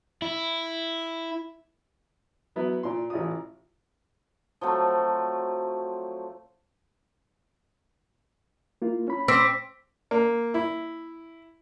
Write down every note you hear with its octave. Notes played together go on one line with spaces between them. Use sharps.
E4
F#3 B3 E4
A#2 F4 C6
A1 E4 F4 D#6
F3 F#3 A3 C4
A#3 E4 F4
C#4 B5
C4 D6 E6 B6
A#3
E4